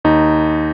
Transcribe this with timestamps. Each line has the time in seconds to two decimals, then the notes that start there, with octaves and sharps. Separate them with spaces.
0.04 D#2 D#4